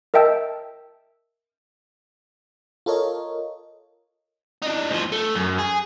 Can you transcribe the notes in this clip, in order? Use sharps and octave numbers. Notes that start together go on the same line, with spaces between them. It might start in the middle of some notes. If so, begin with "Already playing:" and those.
A#4 D#5 E5 G5 A5 E6
F4 A4 A#4 C#5 D#5
D4 D#4
D2 F3
A3
F#2
G#4